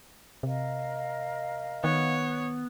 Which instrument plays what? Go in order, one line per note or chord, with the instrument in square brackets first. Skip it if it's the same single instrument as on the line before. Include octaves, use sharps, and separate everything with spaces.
[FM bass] C3 [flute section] A#4 D#5 F5
[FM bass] D#3 [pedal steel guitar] B3 [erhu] C#5